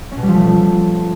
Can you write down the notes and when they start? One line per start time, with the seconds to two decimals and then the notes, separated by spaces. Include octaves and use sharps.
0.12 C#4
0.17 B2
0.23 G3
0.28 F3
0.34 A3